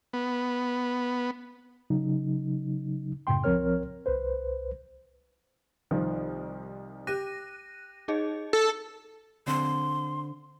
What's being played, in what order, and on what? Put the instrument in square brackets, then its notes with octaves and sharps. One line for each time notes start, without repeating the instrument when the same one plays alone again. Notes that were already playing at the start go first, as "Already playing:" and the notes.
[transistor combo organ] B3
[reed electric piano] C#3 F#3 D#4
F#2 A2 C#3 G5 C6
C2 F3 C4 A#4 C#5 F6
C2 B4 C5
[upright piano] C2 D#3 F3
[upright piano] G4 [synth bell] F#6 A#6 D#7
[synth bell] D#4 G#4 D#5
[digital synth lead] A4
[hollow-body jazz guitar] D3 C4 [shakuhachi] C6